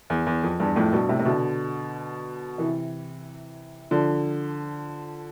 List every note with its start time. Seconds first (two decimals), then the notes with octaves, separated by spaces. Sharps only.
0.10 E2
0.27 E2
0.43 F2
0.60 E2 G2
0.76 F2 A2
0.93 G2 B2
1.09 A2 C3
1.19 C3
1.25 B2 D3
2.58 C3 E3
3.91 D3 F3